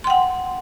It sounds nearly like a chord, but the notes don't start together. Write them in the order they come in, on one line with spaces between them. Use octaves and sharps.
C6 G5 F#5